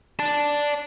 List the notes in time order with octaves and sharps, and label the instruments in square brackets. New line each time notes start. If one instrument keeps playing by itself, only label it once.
[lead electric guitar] D5 A5